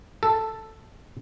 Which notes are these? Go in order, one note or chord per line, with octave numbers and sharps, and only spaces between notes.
A4